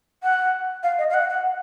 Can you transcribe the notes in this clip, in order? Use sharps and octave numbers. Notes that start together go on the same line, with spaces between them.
F#5
F5
D#5
F5
F#5
F#5